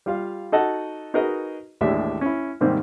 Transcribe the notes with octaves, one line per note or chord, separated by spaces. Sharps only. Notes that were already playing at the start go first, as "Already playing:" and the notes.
G3 F4 F5
D#4 F#4 A4 D#5 F#5 A5
D#4 F#4 G#4 A#4 B4 D#5
A1 D#2 A2 G#3 D4 E5
C#4 E4
G#2 C3 D#3 G3 A#3 C4